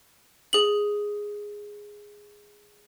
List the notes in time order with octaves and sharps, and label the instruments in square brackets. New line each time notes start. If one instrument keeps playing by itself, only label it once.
[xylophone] G#4 F#7